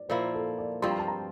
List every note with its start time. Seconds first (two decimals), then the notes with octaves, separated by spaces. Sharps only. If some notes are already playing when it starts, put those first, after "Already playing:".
Already playing: D5
0.09 A#2 F3 A#3 E4 C5
0.34 A4
0.58 D5
0.82 G2 F3 C4 C6
0.90 A#5
0.99 A5
1.07 A#5